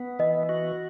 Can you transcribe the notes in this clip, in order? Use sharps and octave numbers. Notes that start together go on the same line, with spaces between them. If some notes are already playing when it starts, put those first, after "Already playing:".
Already playing: B3
E3 D#5
F#4